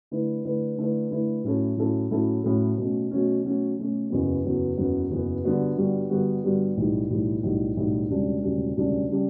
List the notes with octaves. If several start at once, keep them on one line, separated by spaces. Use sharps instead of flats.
D3 A3 E4 B4
D3 A3 E4 B4
D3 A3 E4 B4
D3 A3 E4 B4
A2 F#3 C#4 E4 A4
A2 F#3 C#4 E4 A4
A2 F#3 C#4 E4 A4
A2 F#3 C#4 E4 A4
B2 F#3 A3 C#4
B2 F#3 A3 C#4
B2 F#3 A3 C#4
B2 F#3 A3 C#4
F#1 E2 C#3 F#3 B3
F#1 E2 C#3 F#3 B3
F#1 E2 C#3 F#3 B3
F#1 E2 C#3 F#3 B3
G2 D3 G3 B3 F#4
G2 D3 G3 B3 F#4
G2 D3 G3 B3 F#4
G2 D3 G3 B3 F#4
B1 A2 E3 G3
B1 A2 E3 G3
B1 A2 E3 G3
B1 A2 E3 G3
E1 D2 C#3 G3 D4
E1 D2 C#3 G3 D4
E1 D2 C#3 G3 D4
C#3 G3 D4